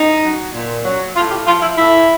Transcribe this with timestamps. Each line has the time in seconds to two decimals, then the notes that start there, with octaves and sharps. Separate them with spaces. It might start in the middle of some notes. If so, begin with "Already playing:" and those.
Already playing: D#4
0.23 F#3
0.55 A#2
0.85 F#3
1.16 A2 F4
1.31 G4
1.47 F3 F4
1.62 E4
1.78 A2 E4